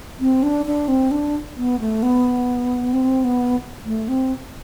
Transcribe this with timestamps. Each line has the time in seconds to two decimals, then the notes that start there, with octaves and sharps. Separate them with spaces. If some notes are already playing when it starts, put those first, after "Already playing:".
0.20 C4
0.43 D4
0.66 D4
0.88 C4
1.11 D4
1.57 B3
1.80 A3
2.03 B3
2.94 C4
3.24 B3
3.85 A3
4.08 C4